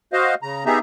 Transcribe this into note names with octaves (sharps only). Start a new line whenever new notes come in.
F#4 C5 D#5 F5
C#3 A#5
B3 D#4 G4 G#4 E5 A#5